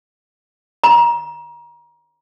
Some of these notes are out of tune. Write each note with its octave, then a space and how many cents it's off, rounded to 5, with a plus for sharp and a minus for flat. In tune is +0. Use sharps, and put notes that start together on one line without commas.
A#5 +30